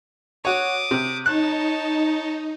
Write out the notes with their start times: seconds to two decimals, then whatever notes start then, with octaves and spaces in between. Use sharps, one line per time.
0.45 F#4 C#5 D6 D#6
0.91 C3
1.26 D#4 C#5 A5 F#6